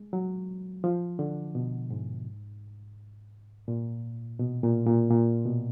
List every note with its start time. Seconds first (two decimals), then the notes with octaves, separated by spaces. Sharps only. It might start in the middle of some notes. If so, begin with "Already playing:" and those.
Already playing: G#3
0.13 F#3
0.84 F3
1.19 D3
1.55 B2
1.90 G#2
3.68 A#2
4.39 B2
4.63 A#2
4.87 A#2
5.10 A#2
5.46 B2